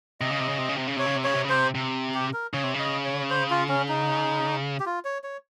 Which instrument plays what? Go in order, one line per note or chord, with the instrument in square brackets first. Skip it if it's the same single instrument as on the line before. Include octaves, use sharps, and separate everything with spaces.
[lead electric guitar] C3 [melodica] D#5
[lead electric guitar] C#3
C3
C#3
C3
C#3
C3
C#3
[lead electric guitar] C3 [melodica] C#5
[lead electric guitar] C#3
C3
[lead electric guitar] C#3 [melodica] C#5
[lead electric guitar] C3
C#3
[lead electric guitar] C3 [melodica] C5
[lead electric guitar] C3
[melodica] G4
A#4
[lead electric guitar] C#3 [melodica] C#5
[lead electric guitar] C3
C#3
[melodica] D#5
C#5
C5
F4
C#4
D#4
G4
F4
C#5
C#5